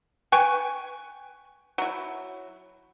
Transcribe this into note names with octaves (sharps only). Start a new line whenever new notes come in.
B4 G5 G#5 C#6
F#3 E4